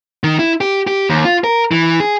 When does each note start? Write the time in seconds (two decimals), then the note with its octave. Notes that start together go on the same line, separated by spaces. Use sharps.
0.24 D#3
0.39 E4
0.61 G4
0.87 G4
1.09 D#2
1.25 F4
1.44 A#4
1.71 E3
2.00 G#4